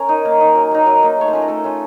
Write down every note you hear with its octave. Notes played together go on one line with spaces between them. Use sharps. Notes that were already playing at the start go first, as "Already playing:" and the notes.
Already playing: C#4 A#4
D#4
A#3
D#4
F#3
A#3 D#4
F#3 B4
A#3 D#4
A3 C#5
C5
C#4 F4 B4
A#4
A3 A4
C#4 F4